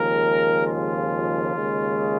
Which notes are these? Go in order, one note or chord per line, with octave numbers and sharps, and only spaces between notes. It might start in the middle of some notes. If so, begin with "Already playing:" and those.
Already playing: D#2 C#3 F3 G#3 A#4
F4
D#2 C#3 G#3